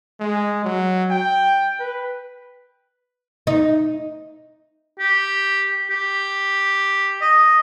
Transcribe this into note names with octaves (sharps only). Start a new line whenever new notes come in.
G#3
F#3
G5
B4
D#4
G4
G4
D#5